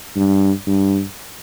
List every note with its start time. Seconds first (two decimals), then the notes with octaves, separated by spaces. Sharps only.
0.16 G2
0.67 G2